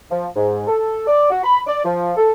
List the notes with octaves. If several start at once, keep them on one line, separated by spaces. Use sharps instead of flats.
F3
G#2
A4
D5
F#4
B5
D5
F3
A4